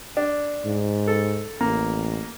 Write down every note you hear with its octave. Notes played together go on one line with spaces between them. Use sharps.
D4
G#2
A4
A1 A#3